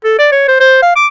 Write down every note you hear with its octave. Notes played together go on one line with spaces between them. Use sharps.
A4
D5
C#5
C5
C5
F5
D6